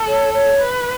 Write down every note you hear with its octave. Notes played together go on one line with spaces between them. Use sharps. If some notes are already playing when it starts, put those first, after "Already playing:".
Already playing: A4
C#5
C#5
B4